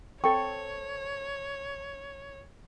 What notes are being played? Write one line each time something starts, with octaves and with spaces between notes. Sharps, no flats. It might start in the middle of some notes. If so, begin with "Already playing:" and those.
C4 A4 C#5 G5 C#6